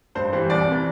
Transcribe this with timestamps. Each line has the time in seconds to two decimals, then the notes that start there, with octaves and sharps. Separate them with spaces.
0.15 G2 C5
0.33 E3 G3 C5
0.50 C2 D5
0.67 C3 E3